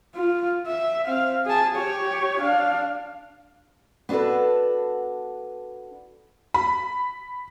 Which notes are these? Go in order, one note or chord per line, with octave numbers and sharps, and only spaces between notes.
F4
E5
C4 F5
G#4 A5
G4 C#5
D4 F5
B3 D4 F#4 A4 B4
B5